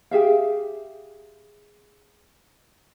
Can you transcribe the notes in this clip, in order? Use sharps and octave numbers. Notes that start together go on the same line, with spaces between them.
G4 G#4 E5 F5